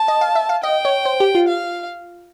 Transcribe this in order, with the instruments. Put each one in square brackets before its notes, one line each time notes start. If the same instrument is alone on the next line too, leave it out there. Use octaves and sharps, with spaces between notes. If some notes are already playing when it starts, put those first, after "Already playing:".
Already playing: [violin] A5
[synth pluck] D#5
F5
E5
F5
[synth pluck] D#5 [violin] G5
[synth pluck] C#5
C5
G4
F4
[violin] F5